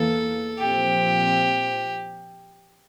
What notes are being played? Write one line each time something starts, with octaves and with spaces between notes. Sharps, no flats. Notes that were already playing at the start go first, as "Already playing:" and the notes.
Already playing: E2 E3 A#3 A4
A#2 F3 C4 G4